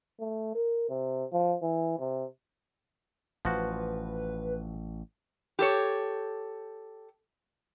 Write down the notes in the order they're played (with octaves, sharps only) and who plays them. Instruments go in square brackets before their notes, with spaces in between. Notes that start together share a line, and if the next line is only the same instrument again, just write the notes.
[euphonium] A3
A#4
C3
F3
E3
C3
[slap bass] A1 [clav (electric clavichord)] F3 F#4 [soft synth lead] B4
[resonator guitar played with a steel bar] G4 A4 C#5